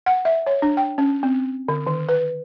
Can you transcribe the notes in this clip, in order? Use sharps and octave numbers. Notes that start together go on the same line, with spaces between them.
F#5
E5
C#5
D4
G5
C#4
C4
D3
D#3
B4